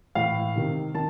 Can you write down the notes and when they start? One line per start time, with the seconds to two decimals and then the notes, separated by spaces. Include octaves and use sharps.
0.15 A2 E3 F5
0.56 C3 D#3
0.95 D#3 A5